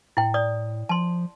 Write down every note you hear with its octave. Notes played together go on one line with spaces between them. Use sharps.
A2 E4 G5
D5 D#6
F3 A5 C6